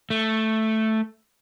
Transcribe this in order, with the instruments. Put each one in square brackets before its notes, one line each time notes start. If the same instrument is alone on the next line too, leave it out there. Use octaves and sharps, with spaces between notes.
[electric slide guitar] A3